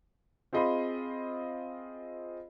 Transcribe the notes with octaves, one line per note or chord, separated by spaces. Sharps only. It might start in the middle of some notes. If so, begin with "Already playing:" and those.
C4 F4 G#4 D#5 B5 C6